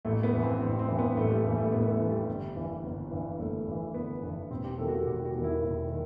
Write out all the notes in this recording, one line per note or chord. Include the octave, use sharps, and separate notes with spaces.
A1 A3
B3
G2 E3
C4
A1 C4
C4
G2 E3
B3
A1 A3
G3
G2 E3 A3
A3
A1 B3
B3
A3
G2 E3
G3
G1
G2 E3
G1
G2 E3
G1 A3
G2 E3
G1 B3
G2 E3
E1 C4
G4
E2 D#3 A4
F#4
G4
E1 G4
F#4
E2 D#3
E4
E1
D#3